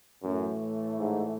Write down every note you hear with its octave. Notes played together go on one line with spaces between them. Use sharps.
F#2 A2 E3 A3
G#2